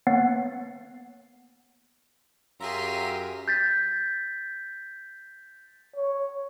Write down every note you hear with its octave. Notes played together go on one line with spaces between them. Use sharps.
A#3 B3 C#5 F#5 A6 C7
F#2 F4 G4 G#4 E5 A#5 B6 D#7
G6 A6 B6
C#5